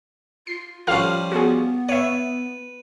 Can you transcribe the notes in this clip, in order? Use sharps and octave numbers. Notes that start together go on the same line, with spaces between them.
F4 C7
F3 G3 C#4 A4 F5 F6
B3 F#4 G#4
B4 C#5 E5